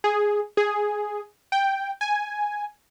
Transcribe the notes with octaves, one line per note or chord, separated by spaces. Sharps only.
G#4
G#4
G5
G#5